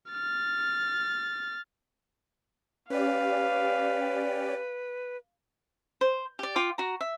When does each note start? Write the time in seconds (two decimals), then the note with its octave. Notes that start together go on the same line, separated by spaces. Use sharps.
0.10 F6 A6
2.90 C#4 G4 B4 D5 F5
6.01 C5
6.39 G4 D5
6.56 F4 G5 D6
6.78 F#4 A#5
7.01 E5